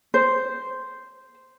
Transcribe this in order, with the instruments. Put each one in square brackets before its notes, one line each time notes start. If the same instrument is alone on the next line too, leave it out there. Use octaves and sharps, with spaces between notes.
[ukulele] C5